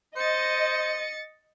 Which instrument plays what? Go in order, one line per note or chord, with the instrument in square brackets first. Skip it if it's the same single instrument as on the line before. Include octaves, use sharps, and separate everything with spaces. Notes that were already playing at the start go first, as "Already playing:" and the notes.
[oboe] C5 [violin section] D#5 [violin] A6 C#7